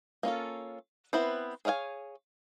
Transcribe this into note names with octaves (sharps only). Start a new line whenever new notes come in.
A#3 C#4 F4 A4
B3 C4 E4 B4 C5
G#4 C#5 F5 F#5 G#5